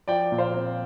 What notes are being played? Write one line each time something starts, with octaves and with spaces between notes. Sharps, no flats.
F3 D5 G5
A#2
C5 F5
C4